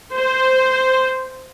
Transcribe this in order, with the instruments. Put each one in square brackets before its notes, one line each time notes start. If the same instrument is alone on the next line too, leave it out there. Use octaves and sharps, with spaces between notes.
[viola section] C5